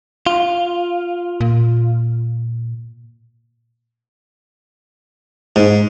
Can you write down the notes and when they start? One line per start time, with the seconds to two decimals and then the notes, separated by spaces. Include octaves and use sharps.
0.27 F4
1.41 A#2
5.56 G#2